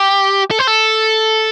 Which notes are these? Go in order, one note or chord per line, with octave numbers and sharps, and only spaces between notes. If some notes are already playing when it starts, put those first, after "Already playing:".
Already playing: G4
A4
C5
A4